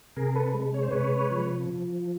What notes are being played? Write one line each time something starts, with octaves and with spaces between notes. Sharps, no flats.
C3 G#4 A#4
A4 B4
G#3
C#5
C5
C3 B4 C#5
F3